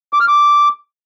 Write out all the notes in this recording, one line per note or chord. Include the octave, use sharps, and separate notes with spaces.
D6
F6
D6